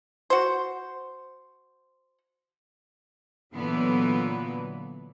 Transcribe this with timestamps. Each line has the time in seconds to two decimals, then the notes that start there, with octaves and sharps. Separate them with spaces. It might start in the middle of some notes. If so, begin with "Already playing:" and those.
0.30 F#4 C5
3.54 A#2 D3 E3 F#3 B3